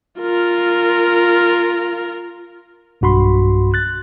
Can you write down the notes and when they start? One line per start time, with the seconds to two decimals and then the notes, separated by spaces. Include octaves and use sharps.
0.20 F4 A#4
3.01 B1 G2 F#4 B5 C6
3.74 F#6 A6